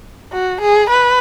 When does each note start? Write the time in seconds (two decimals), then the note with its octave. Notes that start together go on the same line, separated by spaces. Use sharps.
0.32 F#4
0.61 G#4
0.90 B4